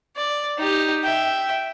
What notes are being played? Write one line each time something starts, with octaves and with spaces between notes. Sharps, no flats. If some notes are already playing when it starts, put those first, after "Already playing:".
D5
D#4 G4
E5 G5